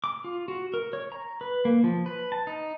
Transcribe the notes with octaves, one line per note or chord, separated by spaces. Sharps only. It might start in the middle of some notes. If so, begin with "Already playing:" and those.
D6
F4
F#4
A#4
C#5
A#5
B4
A#3
F3
B4
A5
D#4